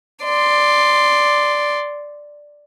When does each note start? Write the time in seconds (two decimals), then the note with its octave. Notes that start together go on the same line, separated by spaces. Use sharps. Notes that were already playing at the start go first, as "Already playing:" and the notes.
0.24 D5 C6